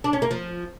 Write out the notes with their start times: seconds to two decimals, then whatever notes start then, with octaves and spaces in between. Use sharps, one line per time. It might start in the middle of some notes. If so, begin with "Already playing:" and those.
0.04 D4
0.13 C#4
0.22 A#3
0.31 F3